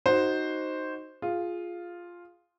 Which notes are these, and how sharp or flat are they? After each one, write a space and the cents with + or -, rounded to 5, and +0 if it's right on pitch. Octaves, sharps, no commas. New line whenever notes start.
D#4 +0 F#4 +10 C5 +0
F4 +0 G#4 +0